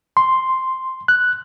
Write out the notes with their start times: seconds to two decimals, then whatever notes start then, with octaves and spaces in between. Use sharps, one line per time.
0.17 C6
1.08 F#6